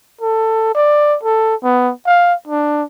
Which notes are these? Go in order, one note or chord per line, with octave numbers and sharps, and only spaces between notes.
A4
D5
A4
B3
F5
D4